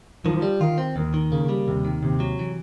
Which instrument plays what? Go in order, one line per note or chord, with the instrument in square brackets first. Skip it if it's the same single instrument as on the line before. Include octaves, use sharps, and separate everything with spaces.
[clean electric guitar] D#3 [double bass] F3
[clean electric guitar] G3
[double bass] D#3 [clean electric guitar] F4
[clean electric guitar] C4
[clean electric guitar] D#2 [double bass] D#3
[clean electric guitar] D#3
[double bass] C#3 [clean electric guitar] A#3
[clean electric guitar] G3
[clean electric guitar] D#2 [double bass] C3
[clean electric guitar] D#3
[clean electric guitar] D#2 [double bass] C3
[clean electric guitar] F#3
E3